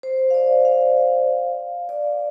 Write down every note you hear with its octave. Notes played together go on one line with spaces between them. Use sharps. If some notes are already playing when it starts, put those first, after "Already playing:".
C5
F5
D5
F5
D5